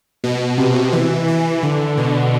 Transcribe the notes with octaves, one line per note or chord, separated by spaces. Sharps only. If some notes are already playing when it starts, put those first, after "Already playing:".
B2
C3
E3
E3
D3
B2